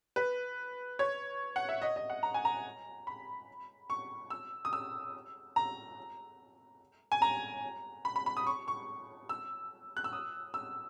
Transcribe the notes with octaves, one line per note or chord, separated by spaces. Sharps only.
B4
C#5
F#5
E5
D#5
D#5
F#5
A#5
G#5
A#5
B5
C#6
E6
D#6
E6
A#5
G#5
A#5
B5
B5
B5
D#6
C#6
C#6
E6
F#6
E6
D#6
E6